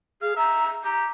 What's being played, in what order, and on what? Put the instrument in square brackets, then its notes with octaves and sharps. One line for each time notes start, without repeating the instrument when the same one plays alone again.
[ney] G#4 [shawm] F5
[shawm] E5 [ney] A#5
[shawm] G4 [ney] A#5